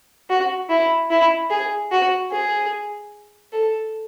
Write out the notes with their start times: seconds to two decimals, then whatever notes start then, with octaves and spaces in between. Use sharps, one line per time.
0.30 F#4
0.69 E4
1.10 E4
1.50 G#4
1.91 F#4
2.31 G#4
3.53 A4